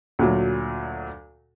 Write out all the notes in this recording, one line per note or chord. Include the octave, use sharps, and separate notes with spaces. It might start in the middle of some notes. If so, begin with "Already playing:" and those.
D2 A#2 F#3